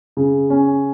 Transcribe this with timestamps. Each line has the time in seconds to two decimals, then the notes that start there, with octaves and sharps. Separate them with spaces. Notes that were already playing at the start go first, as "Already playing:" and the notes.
0.17 C#3
0.50 C#4